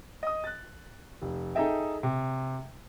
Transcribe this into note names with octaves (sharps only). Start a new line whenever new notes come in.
D#5 D#6
F#6 A6
F1
D#4 G#4 A4 D#5 E5 G5
C3